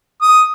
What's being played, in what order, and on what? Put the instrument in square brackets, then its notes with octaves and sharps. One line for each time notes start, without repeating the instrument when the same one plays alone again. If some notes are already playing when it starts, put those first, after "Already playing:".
[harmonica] D#6